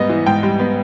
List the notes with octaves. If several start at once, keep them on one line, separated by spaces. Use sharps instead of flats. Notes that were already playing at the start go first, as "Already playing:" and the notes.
Already playing: G#2 G3 B3 D#5
E3
G#2 G5
G3
B3